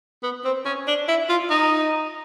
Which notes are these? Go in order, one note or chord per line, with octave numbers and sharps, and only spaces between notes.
B3
C4
C#4
D4
E4
F4
D#4